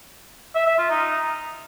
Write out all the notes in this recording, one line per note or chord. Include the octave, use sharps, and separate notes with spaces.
E5
E5
F4
D#4